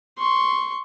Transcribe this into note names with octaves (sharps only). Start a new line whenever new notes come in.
C6 C#6